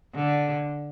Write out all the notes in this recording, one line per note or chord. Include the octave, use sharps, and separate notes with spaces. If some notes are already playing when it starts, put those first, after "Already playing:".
D3